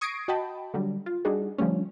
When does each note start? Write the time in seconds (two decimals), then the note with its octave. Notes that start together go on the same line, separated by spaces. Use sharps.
0.01 C#6 D#6 G#6 A#6 C7 D7
0.28 F#4 D#5 G5 A5 B5
0.74 D3 F#3 G3
1.06 F4
1.25 G3 D4 D#4 F#4 G#4
1.58 D3 F3 G3 A3 C#4